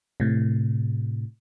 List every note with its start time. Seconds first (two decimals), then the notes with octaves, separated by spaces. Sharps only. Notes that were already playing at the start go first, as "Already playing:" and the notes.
0.20 A2 C3